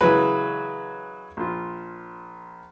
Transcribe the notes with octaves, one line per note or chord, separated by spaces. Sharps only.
C#3 E3 F#3 G#3 F#4 B4
A#1 F4